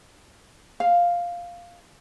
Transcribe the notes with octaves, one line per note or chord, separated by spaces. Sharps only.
F5